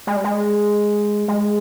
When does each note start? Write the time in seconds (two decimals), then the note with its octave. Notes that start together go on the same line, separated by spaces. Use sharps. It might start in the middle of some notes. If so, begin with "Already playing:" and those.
0.07 G#3
0.16 G3
0.24 G#3
1.28 G#3